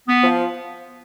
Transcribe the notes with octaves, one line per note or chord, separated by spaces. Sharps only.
B3
F3